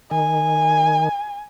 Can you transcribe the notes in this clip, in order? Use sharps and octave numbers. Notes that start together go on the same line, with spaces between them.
D#3 G#5